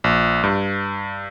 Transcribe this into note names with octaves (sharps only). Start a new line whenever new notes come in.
A#1
G2